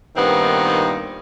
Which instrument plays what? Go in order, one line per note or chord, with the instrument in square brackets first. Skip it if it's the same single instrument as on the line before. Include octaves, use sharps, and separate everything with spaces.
[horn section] G2 A#2 D#3 B3 C4 D#4